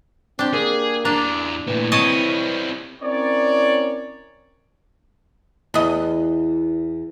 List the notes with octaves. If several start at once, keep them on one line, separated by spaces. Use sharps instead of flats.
C4 D4 G4
A#3 G#4
E2 D4 A#5
A#2 E3 A3
C4 E4 C#5 D#5 A5
C4 C#4 E4 A#4 C#5 D5
E2 D#5